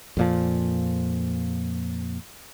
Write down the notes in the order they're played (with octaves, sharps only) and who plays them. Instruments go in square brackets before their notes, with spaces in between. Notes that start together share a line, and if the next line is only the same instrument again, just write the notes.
[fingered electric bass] F2 A#2 F3